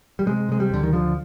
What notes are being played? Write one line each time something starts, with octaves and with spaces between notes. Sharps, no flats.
G3
C3 G#3
C3 G#3
G3
D2 D3
D#3
D3 F3